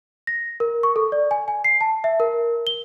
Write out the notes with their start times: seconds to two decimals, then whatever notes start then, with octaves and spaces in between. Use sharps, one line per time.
0.27 A#6
0.60 A#4
0.83 C#6
0.96 A4
1.12 D5
1.31 G#5
1.48 G#5
1.64 C7
1.81 A5
2.04 E5
2.20 A#4
2.67 G7